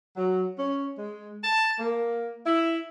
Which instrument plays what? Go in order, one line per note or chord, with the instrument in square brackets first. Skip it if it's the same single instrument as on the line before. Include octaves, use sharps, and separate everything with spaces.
[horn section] F#3
C#4
G#3
A5
A#3
E4